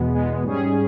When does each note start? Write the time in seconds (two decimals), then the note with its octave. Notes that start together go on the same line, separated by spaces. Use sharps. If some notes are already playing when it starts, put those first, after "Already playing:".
Already playing: E2 B2 G#3 B3
0.12 E2 B2 G#3 B3
0.43 G#2 G3 C#4 G#4